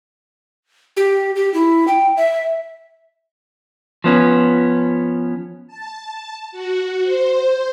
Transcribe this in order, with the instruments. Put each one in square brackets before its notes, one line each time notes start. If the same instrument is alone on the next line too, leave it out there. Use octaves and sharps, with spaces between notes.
[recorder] G4
G4
E4
G5
E5
[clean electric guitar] F3 B3 C#4
[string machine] A5
F#4
C5